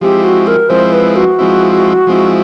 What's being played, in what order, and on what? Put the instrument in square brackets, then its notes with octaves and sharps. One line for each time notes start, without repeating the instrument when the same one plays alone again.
[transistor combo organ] F3 G#3 C4 E4 [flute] G4
[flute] F#4
A#4
[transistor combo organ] F3 G#3 C4 E4 [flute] C5
[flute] B4
F#4
[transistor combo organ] F3 G#3 C4 E4
F3 G#3 C4 E4